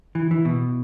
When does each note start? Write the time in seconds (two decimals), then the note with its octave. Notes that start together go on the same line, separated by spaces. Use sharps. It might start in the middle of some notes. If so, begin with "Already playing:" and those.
0.15 E3
0.31 E3
0.45 B2